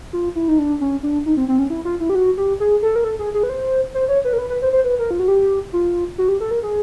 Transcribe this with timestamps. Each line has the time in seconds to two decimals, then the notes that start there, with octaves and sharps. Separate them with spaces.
0.13 F4
0.35 E4
0.48 D#4
0.58 D4
0.81 C#4
1.03 D4
1.26 D#4
1.37 C4
1.48 C4
1.59 C#4
1.70 E4
1.85 F4
2.00 E4
2.10 G4
2.15 F#4
2.37 G4
2.60 G#4
2.82 A4
2.96 A#4
3.04 A4
3.19 G#4
3.34 G#4
3.43 B4
3.50 C5
3.94 C5
4.09 C#5
4.25 B4
4.33 A#4
4.38 B4
4.50 B4
4.62 C5
4.73 C5
4.84 B4
4.99 A#4
5.11 F4
5.19 F#4
5.28 G4
5.73 F4
6.18 F#4
6.29 G4
6.40 A4
6.51 A#4
6.63 G#4